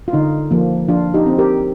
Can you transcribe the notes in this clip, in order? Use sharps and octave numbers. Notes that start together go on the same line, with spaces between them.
F4
D3 D#4
F3 A#3
F3 D4 F4
D#4 G4
C4
G4 A#4